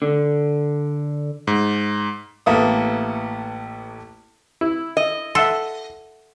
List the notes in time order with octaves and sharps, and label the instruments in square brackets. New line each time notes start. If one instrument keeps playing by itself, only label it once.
[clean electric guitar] D3
[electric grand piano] G#2
[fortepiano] A1 A#3 B3 A4 E5 D#6
E4
[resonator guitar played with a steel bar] D#5
[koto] A4 [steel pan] E5 F#5 C6